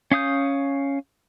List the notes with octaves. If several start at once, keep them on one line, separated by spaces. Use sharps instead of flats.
C#4 F5 D#6 G6